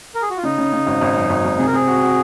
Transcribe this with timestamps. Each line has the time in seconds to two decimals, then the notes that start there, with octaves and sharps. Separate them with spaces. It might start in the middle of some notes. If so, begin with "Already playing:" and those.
0.15 A#4
0.22 G#4
0.30 F#4
0.37 F4
0.43 C#3 D#4
0.58 C#3
0.73 C#3
0.87 G#1
1.01 G#1
1.16 F#2
1.29 G#1
1.45 G#1
1.58 C3 G#4
1.67 A#4
1.73 C4 G#4
1.87 F#4
2.03 F#4